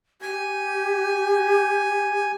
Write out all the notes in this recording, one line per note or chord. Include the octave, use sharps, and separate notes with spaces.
G4 G#5